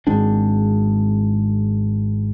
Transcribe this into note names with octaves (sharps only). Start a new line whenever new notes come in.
G#1 G#3 C4 D4